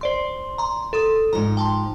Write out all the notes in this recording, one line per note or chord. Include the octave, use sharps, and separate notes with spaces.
C5 D5 C6
A#5 C6
A4 C6 D#6
G#2 F3 A#5
G5 A5 C6